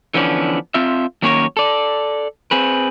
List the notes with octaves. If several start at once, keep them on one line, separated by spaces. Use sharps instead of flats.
D3 E3 F3 B3 C#4 D4
C4 F4 E5
D#3 F#3 A#3 C#4 A#4 C#5
A4 D5
C4 G#4 B4